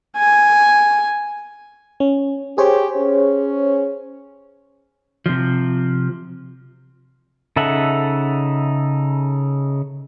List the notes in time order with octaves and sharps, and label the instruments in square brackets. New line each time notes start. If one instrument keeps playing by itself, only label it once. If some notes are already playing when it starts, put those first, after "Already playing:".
[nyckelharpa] G#5
[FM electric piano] C#4
[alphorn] G4 [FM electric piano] G#4 C5 C#5
[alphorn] C#4
[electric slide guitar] C3 F3
[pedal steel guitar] C#3 D#4 A4 E5 F#5